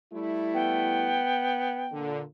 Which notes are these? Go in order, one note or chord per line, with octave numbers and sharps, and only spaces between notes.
G3 A3 E4
B3 G5
A#2 D3